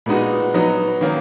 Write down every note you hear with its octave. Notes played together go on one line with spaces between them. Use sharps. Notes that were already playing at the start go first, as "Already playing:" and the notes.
A#2 G#3 B3 D#4 F#4
F#3 B3 D#4
D#3 A#3 C#4